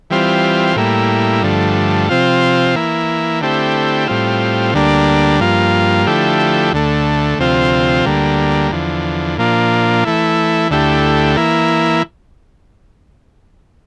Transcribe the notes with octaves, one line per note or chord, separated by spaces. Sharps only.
E3 G3 C4 F4
A2 G3 A#3 E4
G2 D3 F3 A3
C3 F3 C4 F4
E3 A#3 E4
D3 A3 C4 E4 G4
A2 G3 C4 F4
D2 D3 G3 A#3 D4
G2 F3 A#3 F4
D3 F3 A3 E4 G4
D2 D3 A3
D2 C3 F3 C4 F4
D2 D3 G3 A#3
E2 D3 F3
A#2 F3 A#3 D4 F4
E3 A3 E4
D2 D3 A3 E4 G4
E3 A#3 E4